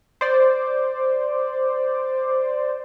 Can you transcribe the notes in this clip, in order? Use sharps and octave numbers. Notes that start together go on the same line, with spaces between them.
C5 D5